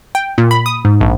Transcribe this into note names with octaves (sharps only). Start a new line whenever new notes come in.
G5
A#2
B5
D#6
G#2
A#1